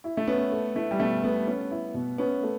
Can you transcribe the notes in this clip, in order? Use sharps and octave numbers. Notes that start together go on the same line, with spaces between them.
E4
A3
B3 C#4
A3
A3 E4
G3
B2 A3
A3 B3
B3 C#4
E4
B2
B3 C#4
A3